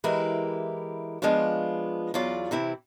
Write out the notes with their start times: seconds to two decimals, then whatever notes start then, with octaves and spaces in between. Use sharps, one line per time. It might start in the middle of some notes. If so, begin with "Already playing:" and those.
0.04 E3 G#3 E4 G4 A#4 B4
1.22 F3 G#3 B3 D4 F4
2.14 E2 F#3 F4 D5
2.51 C3 E3 C4 E4